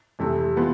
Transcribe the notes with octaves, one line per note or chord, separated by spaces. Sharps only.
F2 C3 E3 A3
E3 B3 F4